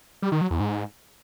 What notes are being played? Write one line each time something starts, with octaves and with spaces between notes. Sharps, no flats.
G3
D#3
F#3
E2
G#2